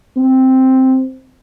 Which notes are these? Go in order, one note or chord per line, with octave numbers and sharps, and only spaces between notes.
C4